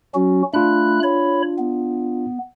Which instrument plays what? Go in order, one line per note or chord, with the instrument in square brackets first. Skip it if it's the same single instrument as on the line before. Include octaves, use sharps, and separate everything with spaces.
[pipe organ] F#3 C#4 F#4
[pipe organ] A3 B5 F#6 [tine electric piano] D4 F4
[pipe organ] C#5 B5
B3